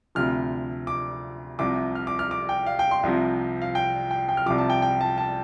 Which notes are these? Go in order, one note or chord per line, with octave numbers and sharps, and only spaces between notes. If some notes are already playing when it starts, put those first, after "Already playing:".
D2 C3 F3 F6
D6
C2 C3 F3 D6
F6
D6
F6
D6
G5
F5
G5
C6
C2 C3 F3
F5
G5
G5
G5
F6
C2 C3 F3 D6
A5
G5
G5
A5
A5